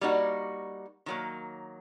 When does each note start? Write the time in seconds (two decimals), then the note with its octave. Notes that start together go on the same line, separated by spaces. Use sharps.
0.01 G3 A#3 D#4 F#4
1.06 D#3 F#3 A#3